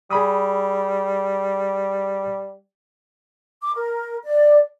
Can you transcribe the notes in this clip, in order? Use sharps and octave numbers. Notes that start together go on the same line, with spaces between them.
G3 G#4 B5 D#6
D6
A#4
D5